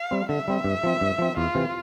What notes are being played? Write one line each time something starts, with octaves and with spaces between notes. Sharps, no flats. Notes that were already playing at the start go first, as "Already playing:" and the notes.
Already playing: F5
G3 C4
D3 E5
G3 C4
G2
F3 C4
G2
F3 C4
E2 F4
C3 E3